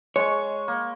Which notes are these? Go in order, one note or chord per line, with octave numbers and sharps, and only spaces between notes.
G#3 C#5 C#6
A#3